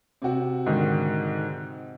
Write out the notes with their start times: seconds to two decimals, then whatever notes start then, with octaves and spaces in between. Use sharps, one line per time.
0.22 C3 C4 F#4
0.66 G#2 D3 D#3